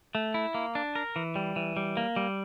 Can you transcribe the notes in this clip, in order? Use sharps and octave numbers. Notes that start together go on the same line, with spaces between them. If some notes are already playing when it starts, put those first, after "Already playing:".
A3
E4
A#3
D4
A#4
E3
G3
E3
G3
A#3
G3